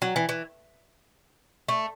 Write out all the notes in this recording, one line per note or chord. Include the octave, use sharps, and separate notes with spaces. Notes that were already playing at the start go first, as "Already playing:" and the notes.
F#3
E3
E3
A3